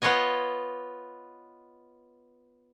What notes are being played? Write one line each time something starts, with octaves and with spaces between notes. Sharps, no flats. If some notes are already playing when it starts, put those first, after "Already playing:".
B3 F4 C#5 D#5 G#5